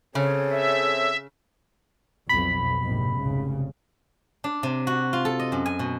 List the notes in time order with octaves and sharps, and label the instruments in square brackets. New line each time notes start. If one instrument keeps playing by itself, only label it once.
[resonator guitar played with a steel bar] C#3 [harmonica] C4 G#4 A4 [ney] C#5
[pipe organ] E5
[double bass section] B1 F2 [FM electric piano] B5
[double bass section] A#1 G#2 C3
F1 C2 C#3
[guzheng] D4
C3
F#4
F4
A4
D#5
F#2
G#5
B2